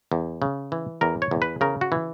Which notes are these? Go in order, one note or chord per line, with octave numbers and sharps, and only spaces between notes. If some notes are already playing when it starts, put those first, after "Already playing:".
E2
C#3
E3
E2 A#4
C#5
E2
B4
C#3 A#4
F#4
E3